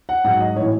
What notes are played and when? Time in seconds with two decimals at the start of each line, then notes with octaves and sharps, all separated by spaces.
0.09 F#5
0.24 G#2 F#3 F#5
0.40 D#5
0.56 A2 E3 C#5